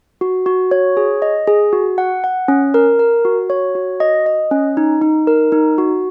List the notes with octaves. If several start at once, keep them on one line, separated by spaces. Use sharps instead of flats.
F#4
F#4
C#5
G#4
D#5
G#4
F#4
F#5
F#5
C#4
A#4
A#4
F#4
C#5
F#4
D#5
D#5
C#4
D#4
D#4
A#4
D#4
F#4